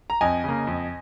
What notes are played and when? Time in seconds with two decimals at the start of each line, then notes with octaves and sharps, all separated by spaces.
0.10 A#5
0.21 F2 D#5 G#5
0.44 C#3 A#3
0.67 F2